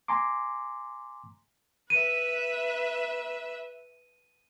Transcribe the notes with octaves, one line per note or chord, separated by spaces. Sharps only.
G#5 A#5 C6 D6
B4 E5 D#7